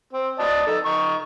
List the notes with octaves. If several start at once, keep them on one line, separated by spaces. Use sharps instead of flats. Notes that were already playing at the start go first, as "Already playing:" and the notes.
C4
D5 D#5 A5
D#4 A4
D#4 C#6